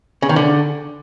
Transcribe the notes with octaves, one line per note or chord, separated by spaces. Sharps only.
C#3
D#3
D3